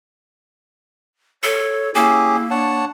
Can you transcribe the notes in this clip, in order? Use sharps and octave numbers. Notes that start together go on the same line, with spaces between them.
A4 C#5
A#3 C#4 E4 G4 G#4
D4 C#5 F#5 A5